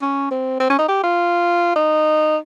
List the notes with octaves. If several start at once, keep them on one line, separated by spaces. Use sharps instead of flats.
C#4
C4
C4
C#4
D#4
G4
F4
D#4